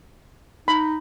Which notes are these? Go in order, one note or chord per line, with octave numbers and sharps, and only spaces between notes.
D#4 B5